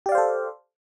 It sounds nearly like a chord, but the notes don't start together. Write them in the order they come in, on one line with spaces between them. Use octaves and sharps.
G4 D5 F5 C5 A4